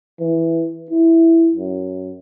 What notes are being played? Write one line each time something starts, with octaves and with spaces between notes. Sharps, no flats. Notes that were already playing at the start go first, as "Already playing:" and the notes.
E3
E4
F#2